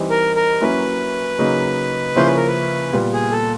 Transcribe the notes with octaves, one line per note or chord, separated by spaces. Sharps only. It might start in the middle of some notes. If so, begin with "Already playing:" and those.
Already playing: E3 G3 C4 D#4
A#4
A#4
F#3 A#3 C#4 E4 B4
C#3 F#3 A#3 D#4
C#3 F3 A#3 C#4 E4 C5
B4
A#4
B4
A#2 G3 B3
G#4
A4